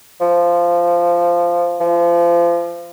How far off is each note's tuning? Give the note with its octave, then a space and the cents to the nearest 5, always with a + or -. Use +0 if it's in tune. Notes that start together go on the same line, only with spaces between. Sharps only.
F3 -10
F3 -30